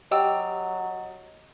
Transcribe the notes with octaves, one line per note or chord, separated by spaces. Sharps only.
F#3 G4 D#5 G5 E6